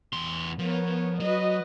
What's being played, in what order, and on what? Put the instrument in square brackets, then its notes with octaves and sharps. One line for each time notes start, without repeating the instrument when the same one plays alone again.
[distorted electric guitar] E2 C6
[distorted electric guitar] F3 [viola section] B3 A#4 C#5
[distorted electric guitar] F#3 [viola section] F#4 B4 D#5